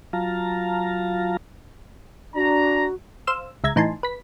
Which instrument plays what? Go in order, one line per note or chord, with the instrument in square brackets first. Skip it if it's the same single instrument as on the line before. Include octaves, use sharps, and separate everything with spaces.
[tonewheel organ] F#3 F4 F5 A5 A#5
[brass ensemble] D4 A#5 [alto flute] F#4
[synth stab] C5 F5 E6
C#2 E5 A#5 G#6
A2 E3 D#4 G#5 A5 C6
B4 B6